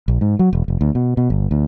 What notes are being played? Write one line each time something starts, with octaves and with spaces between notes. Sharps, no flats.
A#1
G#2
F#3
E1
F1
D2
B2
B2
G1
D2